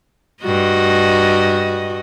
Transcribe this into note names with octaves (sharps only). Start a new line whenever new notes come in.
G2 F#4 D#5